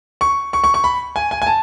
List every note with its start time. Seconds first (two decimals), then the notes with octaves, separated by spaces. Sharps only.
0.21 C#6
0.53 C#6
0.64 C#6
0.74 C#6
0.84 B5
1.16 G#5
1.31 G#5
1.42 G#5
1.46 A5